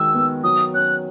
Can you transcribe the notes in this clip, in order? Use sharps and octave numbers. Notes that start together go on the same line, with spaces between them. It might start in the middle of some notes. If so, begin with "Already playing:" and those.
Already playing: D#3 G#3 F#4 E6
B3
F#3 D#6
C#4 F#6